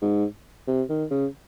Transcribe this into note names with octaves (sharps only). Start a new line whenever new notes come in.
G#2
C3
D#3
C#3